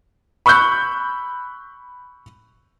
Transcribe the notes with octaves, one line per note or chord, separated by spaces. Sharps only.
B5 C#6 E6 F#6 G6